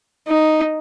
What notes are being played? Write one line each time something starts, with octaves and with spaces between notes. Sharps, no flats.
D#4